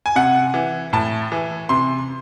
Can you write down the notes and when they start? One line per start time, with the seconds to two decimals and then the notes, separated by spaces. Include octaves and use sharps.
0.06 G#5
0.16 C3 F#5
0.54 E3
0.93 A2 A5
1.32 E3
1.69 C3 C6